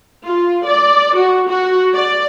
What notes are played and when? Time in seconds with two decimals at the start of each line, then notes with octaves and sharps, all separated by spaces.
0.24 F4
0.66 D5
1.16 F#4
1.48 F#4
1.94 D5